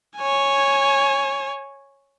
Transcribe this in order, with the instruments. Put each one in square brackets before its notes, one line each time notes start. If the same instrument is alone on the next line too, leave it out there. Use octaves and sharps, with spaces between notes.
[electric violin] C#5 G#5